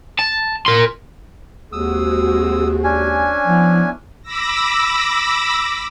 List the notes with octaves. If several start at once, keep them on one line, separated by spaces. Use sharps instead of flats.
A5
A#4 C6
D#2 G#3 C4 F#4 D#6 E6
C#4 D4 G#5
F3 B3 E4
B5 D6 E6 A#6